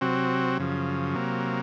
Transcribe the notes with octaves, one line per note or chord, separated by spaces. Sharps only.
C3 F#3 C4 F#4
F#2 C#3 F3
C3 F#3 A#3